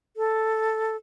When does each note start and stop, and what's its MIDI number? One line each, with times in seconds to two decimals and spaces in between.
0.17 0.96 69